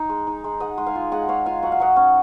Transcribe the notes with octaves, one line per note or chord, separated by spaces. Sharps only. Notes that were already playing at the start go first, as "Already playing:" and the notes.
Already playing: D#4
G#3
D#4
G#3
G#3 D#5 F#5
G#3
F5 G#5
F4
G#3 D#5 F#5
G#3 C#5 F5
F4 F5 G#5
F#3 F#5
F5
F#3 D#5 F#5
C#4